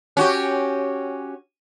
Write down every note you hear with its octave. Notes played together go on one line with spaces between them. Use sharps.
C#4 F#4 G4